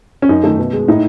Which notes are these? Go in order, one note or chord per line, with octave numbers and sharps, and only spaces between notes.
C#4
F#2 D#4
D#3 A3
B2
G#3
A2 D#4